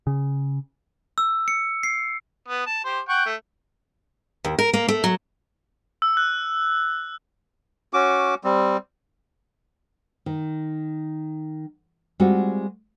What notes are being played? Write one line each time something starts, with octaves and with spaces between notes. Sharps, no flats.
C#3
E6
C#7
C7
B3
A5
G4 C5
F#5 G5 C#6
A3
D#2
A#4
A#3
A3
F#3
E6
F#6
C#4 F#4 D6
G3 C4
D#3
G3 G#3 C4 F4 F#4